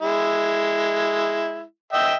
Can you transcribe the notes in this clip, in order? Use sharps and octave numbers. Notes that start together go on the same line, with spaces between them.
G#3 E4
D#5 E5 G5